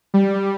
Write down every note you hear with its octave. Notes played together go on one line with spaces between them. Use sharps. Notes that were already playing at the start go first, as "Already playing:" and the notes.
G3